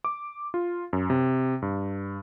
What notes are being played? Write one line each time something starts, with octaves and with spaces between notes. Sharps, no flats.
D6
F4
F#2
C3
G2